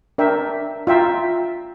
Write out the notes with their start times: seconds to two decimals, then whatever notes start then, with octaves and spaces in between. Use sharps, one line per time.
0.18 D4 A#4 E5 G5
0.87 F4 E5 G5 A#5